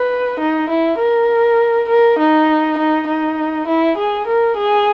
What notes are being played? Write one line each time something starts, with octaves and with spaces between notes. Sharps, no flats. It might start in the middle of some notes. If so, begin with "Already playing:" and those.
Already playing: B4
D#4
E4
A#4
A#4
D#4
D#4
D#4
E4
G#4
A#4
G#4